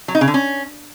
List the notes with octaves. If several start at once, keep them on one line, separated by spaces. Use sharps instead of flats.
F#3
D#4
C#3
D3
C#4